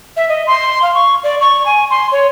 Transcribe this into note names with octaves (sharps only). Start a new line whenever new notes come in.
E5
D#5
C6
F5
C#6
D5
C#6
G#5
C6
C#5